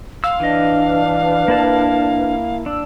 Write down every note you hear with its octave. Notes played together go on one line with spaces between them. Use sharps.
F5 C6 E6
E3 D4 B4 D#5 F6
A#3 E4 A5
D4 E6